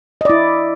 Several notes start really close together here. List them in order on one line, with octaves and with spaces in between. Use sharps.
D#5 D5 E4